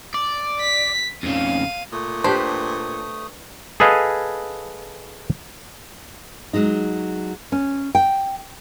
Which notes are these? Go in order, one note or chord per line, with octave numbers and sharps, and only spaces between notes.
D5
B6
F2 C#3 F5 D#7
A#2 A3 D#6
D4 G4 B4 C5
G#4 A4 B4 D#5 F5 G#5
F#3 G#3 D#4
C#4
G5